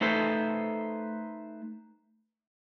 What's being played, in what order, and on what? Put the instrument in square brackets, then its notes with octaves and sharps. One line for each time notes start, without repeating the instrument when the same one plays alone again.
[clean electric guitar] A3 D#4 A4 B4 C5